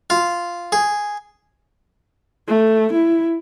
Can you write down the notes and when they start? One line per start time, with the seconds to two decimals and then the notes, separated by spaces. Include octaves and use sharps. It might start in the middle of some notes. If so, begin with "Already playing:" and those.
0.10 F4
0.72 G#4
2.48 A3
2.93 E4